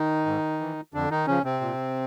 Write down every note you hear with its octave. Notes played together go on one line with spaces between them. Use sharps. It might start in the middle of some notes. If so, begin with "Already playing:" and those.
Already playing: D#3 D#4
G#2
E3
F2 D3 D4
D#3 D#4
C#3 F3 C#4
C3 C4
A#2